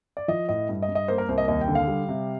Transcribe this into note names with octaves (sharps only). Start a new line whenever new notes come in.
D5
F3 D#5
A2 D#5
G2
D#5
G2
D#5
A#3 C5
A#4
C2 C5
D#5
D#2 D#5
G5
D3
F5
G3
C3